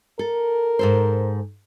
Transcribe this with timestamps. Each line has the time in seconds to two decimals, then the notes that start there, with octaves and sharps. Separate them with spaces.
0.19 A4 A#4
0.79 G#2 A4 C5